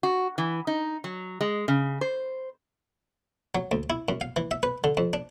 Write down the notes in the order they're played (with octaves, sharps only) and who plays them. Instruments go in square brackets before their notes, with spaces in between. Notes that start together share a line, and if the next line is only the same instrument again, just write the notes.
[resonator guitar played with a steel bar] F#4
E3
D#4
F#3
G#3
C#3
C5
[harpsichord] F#3
D2
E4
F#2
F5
E3
E5
B4
D3
F2
D4